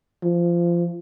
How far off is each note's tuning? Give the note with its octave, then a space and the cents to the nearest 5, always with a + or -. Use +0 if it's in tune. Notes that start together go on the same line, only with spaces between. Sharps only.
F3 -20